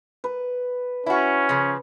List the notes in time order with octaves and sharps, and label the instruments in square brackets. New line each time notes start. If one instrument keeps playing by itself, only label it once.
[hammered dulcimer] B4
[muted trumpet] C#4 [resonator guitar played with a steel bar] E4 F#4
[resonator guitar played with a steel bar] C#3 F3